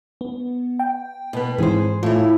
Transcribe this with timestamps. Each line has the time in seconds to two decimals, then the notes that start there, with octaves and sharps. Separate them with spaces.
0.21 B3
0.79 G5
1.33 B2 B3
1.58 G#2 E3 C4 G#4 C5
2.03 A2 E3 F4